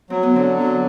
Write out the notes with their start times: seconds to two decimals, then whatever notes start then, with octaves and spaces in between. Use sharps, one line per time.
0.10 F#3 C4
0.23 B3
0.34 D3 C4
0.57 F#3